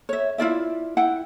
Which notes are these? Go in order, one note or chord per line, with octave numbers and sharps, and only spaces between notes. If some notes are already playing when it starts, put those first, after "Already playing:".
C#5 E5
E4 F4 D5 E5
E4 F#5 G5